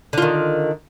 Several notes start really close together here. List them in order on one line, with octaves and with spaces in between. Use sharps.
D3 F4 D#3